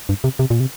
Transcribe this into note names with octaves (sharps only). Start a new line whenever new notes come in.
G2
C3
C3
A#2
C3